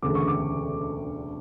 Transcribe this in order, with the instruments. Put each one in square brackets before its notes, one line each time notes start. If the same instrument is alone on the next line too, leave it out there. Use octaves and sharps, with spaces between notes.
[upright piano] E1 D2 C#3 D6
C#6
D6